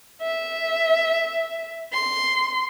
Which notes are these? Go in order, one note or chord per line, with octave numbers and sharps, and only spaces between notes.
E5
C6